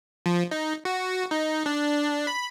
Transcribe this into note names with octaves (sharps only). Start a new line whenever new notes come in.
F3
D#4
F#4
D#4
D4
B5